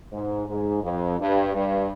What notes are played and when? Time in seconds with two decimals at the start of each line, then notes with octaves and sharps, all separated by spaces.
0.11 G#2
0.46 G#2
0.82 F2
1.18 G2
1.53 G2